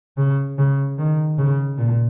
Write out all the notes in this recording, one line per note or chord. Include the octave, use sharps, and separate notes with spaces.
C#3
C#3
D#3
C#3
A#2